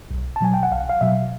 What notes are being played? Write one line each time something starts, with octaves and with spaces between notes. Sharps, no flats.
B1
A5
B2 F#3 G#5
G5
F#5
B1 F5
F5
B2 F#3 E5